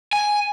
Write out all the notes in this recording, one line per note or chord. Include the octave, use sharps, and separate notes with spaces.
G#5